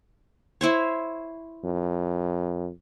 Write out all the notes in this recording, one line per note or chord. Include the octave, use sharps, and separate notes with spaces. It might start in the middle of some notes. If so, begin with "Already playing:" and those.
E4 C5 C#5
F2